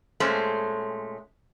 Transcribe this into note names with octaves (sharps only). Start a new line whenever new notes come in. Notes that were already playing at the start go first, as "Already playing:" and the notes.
A#2 G#3 A3 C#4 C5